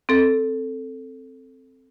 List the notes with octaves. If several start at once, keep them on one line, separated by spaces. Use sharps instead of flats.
C4 A4